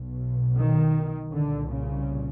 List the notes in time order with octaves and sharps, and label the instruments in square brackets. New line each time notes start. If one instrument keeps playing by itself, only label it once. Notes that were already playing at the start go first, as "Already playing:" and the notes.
Already playing: [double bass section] B1 B2
D#3
C2 A#2 D3
C#3